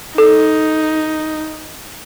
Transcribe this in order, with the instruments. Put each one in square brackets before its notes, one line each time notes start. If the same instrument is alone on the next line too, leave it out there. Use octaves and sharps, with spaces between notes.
[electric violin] D#4 [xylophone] A4